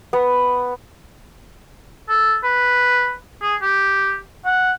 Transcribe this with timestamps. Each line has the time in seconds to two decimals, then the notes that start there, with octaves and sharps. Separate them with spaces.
0.13 B3
2.09 A4
2.44 B4
3.42 G#4
3.62 G4
4.46 F#5